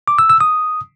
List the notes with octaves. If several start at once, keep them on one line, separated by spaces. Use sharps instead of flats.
D6
E6
E6
D#6